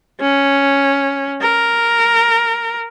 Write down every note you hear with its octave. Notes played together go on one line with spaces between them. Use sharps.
C#4
A#4